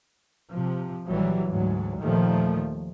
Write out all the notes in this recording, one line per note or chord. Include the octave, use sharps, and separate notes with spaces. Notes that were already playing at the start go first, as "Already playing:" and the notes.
C3 F3
A#1 E3 F#3 G3
D2 G#2 F#3
D#2 A#2 D#3 F3 A3